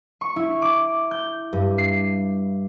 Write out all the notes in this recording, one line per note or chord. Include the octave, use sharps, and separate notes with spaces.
C#6
E4
D6
G6
G2
C7